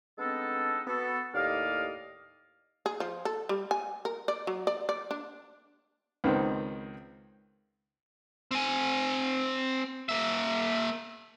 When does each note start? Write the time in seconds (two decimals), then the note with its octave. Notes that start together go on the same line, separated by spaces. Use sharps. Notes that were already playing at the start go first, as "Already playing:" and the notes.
0.18 G#3 B3 C4 D4 D#4 A4
0.87 B3 F#4 A4
1.34 D#2 A2 G4 D5 D#5 F5
2.86 G#4
3.00 F3
3.25 A4
3.49 G3
3.71 G#5
4.05 A#4
4.28 D5
4.47 F#3
4.67 D5
4.89 D5
5.11 D4
6.24 C#2 D#3 B3 C4
8.51 C4 G#5
10.09 A#3 E5